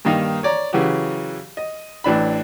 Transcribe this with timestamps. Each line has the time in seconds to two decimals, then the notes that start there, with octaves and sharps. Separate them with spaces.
0.05 G2 D#3 A#3 D#4
0.43 C#5 D5 A#5
0.73 C#3 E3 F#3 F#4 G4
1.57 D#5
2.04 A1 E3 D4 B5